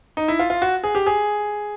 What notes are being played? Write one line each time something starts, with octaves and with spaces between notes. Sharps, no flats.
D#4
E4
F4
F4
F#4
G#4
G4
G#4